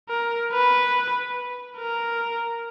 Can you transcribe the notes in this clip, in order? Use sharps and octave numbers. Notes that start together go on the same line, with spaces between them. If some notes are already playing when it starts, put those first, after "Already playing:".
A#4
B4
A#4